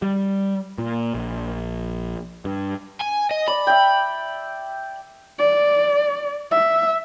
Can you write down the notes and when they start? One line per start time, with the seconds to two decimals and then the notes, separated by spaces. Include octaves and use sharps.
0.02 G3
0.78 A#2
1.14 A#1
2.45 G2
3.01 G#5
3.31 D#5
3.48 D5 B5
3.67 E5 G5
5.39 D5
6.51 E5